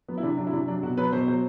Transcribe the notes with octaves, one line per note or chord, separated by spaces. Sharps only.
F#3 B3
E4
C3 D4
F#3 D4
E4
C3 D4
F#3 D4
B2 F#4
F#3 B4
B2 C5
F#3 C5